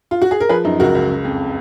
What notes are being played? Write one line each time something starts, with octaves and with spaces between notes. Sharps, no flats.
F4
F#4
G#4
A#4
F3 G#4 B4
F#2 D#4
C#2 F#4 A#4
C#2
C#3
F2